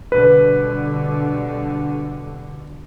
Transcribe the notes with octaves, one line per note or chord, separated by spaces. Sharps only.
B2 D3 G3 B4